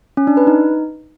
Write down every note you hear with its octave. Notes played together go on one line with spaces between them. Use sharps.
C#4
D4
B4
D#4